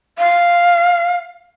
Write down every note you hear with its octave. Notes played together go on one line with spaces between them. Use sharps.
F5